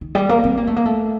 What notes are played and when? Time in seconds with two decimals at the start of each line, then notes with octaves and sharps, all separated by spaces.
0.01 D#3
0.15 G3
0.29 A#3
0.44 C4
0.57 A#3
0.67 A3
0.76 A#3
0.86 A3